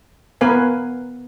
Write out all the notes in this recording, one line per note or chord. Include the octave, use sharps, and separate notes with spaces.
B3 A#4 B4 F5 G#5